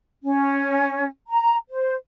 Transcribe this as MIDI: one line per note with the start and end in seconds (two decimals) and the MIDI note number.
0.23 1.04 61
1.27 1.56 82
1.70 1.93 72